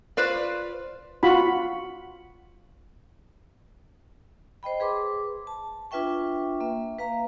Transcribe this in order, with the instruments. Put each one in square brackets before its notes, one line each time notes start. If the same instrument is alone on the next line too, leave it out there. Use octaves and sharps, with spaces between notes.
[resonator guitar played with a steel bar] F4 B4 C5 D5
[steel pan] F4 F#4 B5
[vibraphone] C5 D#5 G5 B5
G#4 B4 C6 D6
A5
D4 F4 B4 E5 G5 C#6
A#3 E5
B4 F5 A#5